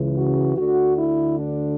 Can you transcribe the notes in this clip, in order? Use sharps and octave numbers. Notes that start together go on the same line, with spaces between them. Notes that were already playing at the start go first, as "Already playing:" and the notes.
Already playing: C#2 C#3 E3
F#4
D2 D3 F#4
E4
D4